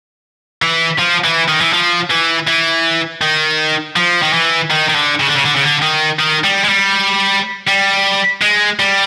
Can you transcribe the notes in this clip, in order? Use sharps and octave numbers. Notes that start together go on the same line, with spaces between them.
E3
F3
E3
D#3
E3
F3
E3
E3
D#3
F3
D#3
E3
D#3
D#3
D3
C#3
D3
C#3
D3
C#3
D3
D#3
D#3
G3
G#3
G3
G3
G#3
G3